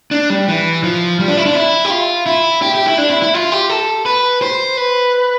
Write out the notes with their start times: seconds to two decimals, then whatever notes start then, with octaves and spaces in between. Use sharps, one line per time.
0.11 D4
0.30 G3
0.48 E3
0.84 F3
1.20 G3
1.28 D4
1.37 E4
1.46 D4
1.55 E4
1.85 G4
1.90 F4
2.26 E4
2.62 G4
2.75 G4
2.86 E4
2.98 D4
3.10 E4
3.22 E4
3.34 F4
3.52 G4
3.70 A4
4.06 B4
4.42 C5
4.77 B4